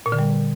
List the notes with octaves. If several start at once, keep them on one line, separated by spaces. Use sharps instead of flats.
A#2
D3
G3